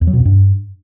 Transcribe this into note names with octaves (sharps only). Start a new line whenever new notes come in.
E2
F#3
B2
F2
G2